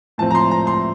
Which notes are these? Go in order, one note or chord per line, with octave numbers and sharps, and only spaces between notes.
A2 F3 C4 A5
A#5
C6
A#5
C6